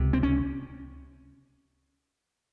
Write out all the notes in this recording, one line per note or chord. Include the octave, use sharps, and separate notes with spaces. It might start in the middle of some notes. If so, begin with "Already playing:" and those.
Already playing: C#2 C3
C4
C#4